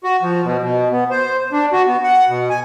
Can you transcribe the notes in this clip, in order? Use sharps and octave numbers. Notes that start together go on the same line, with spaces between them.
F#4
F3
B2
B2
B3
C5
D4
F#4
B3
F#5
B2
G#5